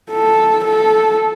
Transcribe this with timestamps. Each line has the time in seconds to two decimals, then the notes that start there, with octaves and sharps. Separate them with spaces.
0.11 A4
0.65 A4